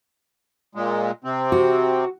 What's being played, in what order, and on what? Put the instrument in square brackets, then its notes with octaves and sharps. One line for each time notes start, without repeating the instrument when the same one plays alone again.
[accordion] A#2 G#3
C3 C4
[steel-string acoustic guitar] F#4